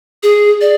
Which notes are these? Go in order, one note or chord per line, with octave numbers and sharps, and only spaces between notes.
G#4
D5